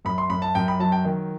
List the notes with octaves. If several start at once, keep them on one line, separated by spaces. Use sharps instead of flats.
F#2 B5
C6
F#2 B5
A5
F#2 G5
B5
F#3 A5
G5
D#3